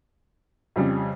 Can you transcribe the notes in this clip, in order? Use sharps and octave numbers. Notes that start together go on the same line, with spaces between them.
F2 C#3 G3